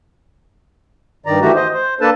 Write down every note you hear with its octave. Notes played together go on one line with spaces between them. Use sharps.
G2 D#3 D5 A#5
D#3 E3 A3 F#4 G4 A#5
C5 D#5
C5
A#3 D4 A4 B4 A5